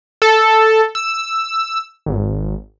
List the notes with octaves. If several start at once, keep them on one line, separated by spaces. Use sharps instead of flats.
A4
E6
G#1